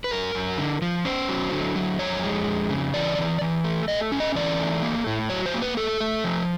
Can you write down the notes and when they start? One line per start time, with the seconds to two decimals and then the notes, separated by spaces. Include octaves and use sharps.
0.04 B4
0.11 F#2 A#4
0.35 F#2
0.58 D3
0.82 F3
1.05 C#4 C5
1.29 F#3
1.52 D3
1.76 F#3
1.99 F2 C#5
2.23 G#3
2.47 F2
2.70 C#3
2.94 E3 D5
3.18 E3
3.41 E3
3.64 A3
3.88 A3 D#5
4.12 C#4
4.20 D#5
4.35 E3 D5
4.59 A3
4.82 A#3
5.07 A2
5.30 F#3 C#5
5.46 C5
5.54 A#3
5.62 B4
5.77 A3 A4
6.00 A3
6.24 F3